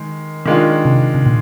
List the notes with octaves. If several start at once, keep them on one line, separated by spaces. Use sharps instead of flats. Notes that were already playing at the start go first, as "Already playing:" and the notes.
Already playing: D#3 G#3
D#3 G#3 D4 F4
C3
C3
A#2